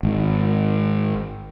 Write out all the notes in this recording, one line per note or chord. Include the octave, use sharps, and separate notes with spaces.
G#1